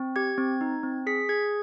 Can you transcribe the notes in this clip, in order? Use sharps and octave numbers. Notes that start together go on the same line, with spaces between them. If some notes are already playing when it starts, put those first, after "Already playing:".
Already playing: C4
G4 G#6
C4
D#4
C4
G#4 B6
G#4 G#6